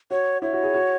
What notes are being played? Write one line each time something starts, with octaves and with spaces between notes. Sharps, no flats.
F#4 C#5
E4 C#5
F#4
G#4
F#4